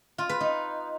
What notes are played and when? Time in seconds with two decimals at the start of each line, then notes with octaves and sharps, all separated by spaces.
0.18 F4
0.29 B4
0.41 D#4